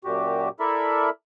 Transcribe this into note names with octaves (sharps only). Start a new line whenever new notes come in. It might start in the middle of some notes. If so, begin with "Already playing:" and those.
F#2 A#2 F#4 G4
E4 A4 A#4 D5 E5 B5